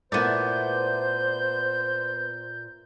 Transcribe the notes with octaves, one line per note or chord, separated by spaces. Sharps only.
A#2 A3 B3 E4 C5 D5 G6